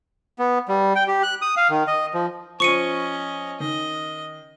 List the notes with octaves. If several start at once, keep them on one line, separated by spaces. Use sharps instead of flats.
B3
G3
G5
G4
F#6
D#6
F5
D#3
D#5
F3
F3 C#4 D#5 C#6 C#7 D#7
D#3 D#5